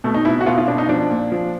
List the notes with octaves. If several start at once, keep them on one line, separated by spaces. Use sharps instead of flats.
B2 A3
D#4
B2 E4
F#4
B2 F4
F4
B2 D4
D#4
F3 D4
A#2
F3